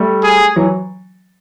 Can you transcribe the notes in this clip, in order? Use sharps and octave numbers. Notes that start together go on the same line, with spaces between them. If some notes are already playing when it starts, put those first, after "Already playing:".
Already playing: G3 A3
G#4
E3 F#3